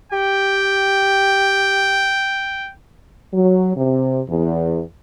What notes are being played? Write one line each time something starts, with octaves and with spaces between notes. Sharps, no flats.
G4 G5
F#3
C3
E2